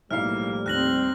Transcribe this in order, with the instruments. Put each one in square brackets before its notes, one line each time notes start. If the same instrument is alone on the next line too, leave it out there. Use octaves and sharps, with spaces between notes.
[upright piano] B1 E4 F5 [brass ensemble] A2 F3 G3 [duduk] A#3 [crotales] F6
[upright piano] D#2 [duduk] C4 [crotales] F#6 A#6 F#7